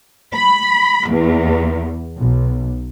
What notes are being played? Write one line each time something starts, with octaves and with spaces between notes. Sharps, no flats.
B5
E2
B1